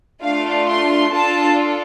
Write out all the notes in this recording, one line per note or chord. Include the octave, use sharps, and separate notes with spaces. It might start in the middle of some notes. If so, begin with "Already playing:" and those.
A3 D4 F4 F5
C6
D4 F4 A4 A5